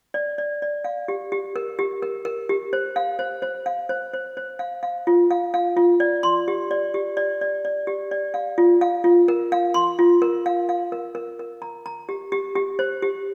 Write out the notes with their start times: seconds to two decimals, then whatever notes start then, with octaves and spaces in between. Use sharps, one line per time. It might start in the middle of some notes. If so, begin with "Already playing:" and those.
0.14 D5
0.38 D5
0.62 D5
0.84 F5
1.08 G4
1.32 G4
1.56 A#4
1.79 G4
2.02 A#4
2.25 A#4
2.49 G4
2.73 C5
2.96 F5
3.19 C5
3.42 C5
3.66 F5
3.89 C5
4.14 C5
4.37 C5
4.59 F5
4.83 F5
5.07 F4
5.31 F5
5.54 F5
5.77 F4
6.00 D5
6.23 C6
6.48 G4
6.71 D5
6.94 G4
7.17 D5
7.41 D5
7.65 D5
7.87 G4
8.11 D5
8.34 F5
8.58 F4
8.81 F5
9.04 F4
9.28 A#4
9.52 F5
9.74 C6
9.99 F4
10.22 A#4
10.46 F5
10.69 F5
10.92 A#4
11.15 A#4
11.39 A#4
11.62 A#5
11.86 A#5
12.09 G4
12.32 G4
12.56 G4
12.79 C5
13.02 G4